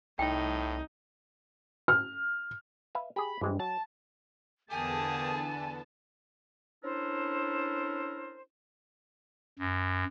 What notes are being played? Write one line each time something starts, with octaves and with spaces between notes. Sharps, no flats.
C2 A2 D#4 G5
F6
B4 E5 F5
G4 G#4 B5
G2 E3 G#3 C4
F#3 A5
E2 D3 A#3 B3 G4 G#4 G#5 A5
C#4 D4 E4 A4 A#4 C5
F#2